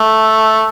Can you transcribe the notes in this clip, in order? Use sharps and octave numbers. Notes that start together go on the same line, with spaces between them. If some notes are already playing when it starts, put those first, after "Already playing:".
Already playing: A3